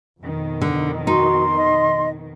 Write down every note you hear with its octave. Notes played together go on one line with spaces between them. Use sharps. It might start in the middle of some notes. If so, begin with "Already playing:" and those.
F2 B2 D#3
D3
D#4 F#4 C6
D#5